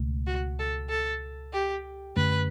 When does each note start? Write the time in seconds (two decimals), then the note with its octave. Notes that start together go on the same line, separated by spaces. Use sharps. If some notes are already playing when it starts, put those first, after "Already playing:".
Already playing: C#2 B2 A3
0.27 F#4
0.59 A4
0.90 A4
1.53 G4
2.16 F#2 D3 A3 C#4 B4